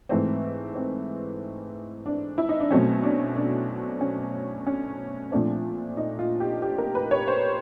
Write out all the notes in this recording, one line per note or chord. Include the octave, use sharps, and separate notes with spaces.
G#2 E3 A3 C4
C4
D4
E4
D#4
D4
B2 F#3 A3 C4 C#4
D4
D4
C#4
C#4
A#2 F3 A3 C4 D4
D#4
F4
G4
G4
A#4
B4
C#5
C5